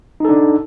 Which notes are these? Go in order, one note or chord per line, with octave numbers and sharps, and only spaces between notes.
D4 D#4 A4